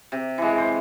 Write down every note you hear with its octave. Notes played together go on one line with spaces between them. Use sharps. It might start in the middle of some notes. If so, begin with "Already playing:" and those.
C3
E3 G#3
C5